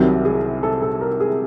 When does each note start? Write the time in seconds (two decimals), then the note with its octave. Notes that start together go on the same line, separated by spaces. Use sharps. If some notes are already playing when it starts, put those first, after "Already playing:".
Already playing: C2 C3 D#3 F#3
0.25 G#4
0.63 A4
0.82 A4
1.01 A#4
1.20 G#4